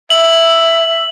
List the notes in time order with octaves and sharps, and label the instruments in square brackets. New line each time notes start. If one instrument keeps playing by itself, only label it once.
[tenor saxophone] E5 [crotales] F#7